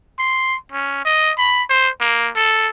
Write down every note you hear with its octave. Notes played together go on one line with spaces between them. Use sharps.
C6
C#4
D#5
B5
C5
A#3
A4